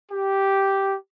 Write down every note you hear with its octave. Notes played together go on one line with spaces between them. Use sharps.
G4